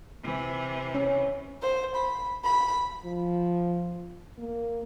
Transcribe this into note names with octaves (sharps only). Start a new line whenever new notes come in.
C3 E3
C#4
C5
B5
B5
F3
A#3